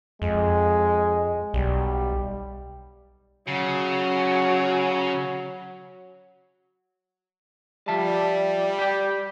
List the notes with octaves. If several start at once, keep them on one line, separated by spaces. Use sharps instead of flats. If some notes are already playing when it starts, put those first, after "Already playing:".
F2 G#3
B1 G3
C#3 F#3
F3 G3 E5 A5
G4 G5